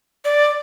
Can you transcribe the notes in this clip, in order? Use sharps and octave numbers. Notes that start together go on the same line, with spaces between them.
D5